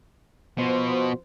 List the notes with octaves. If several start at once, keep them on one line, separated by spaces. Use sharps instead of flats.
B2 F3 F#4 C5